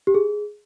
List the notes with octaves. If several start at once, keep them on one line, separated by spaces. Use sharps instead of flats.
G4
G#4